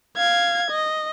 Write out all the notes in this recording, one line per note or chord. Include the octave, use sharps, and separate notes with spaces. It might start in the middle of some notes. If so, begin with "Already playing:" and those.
F5 G#6
D#5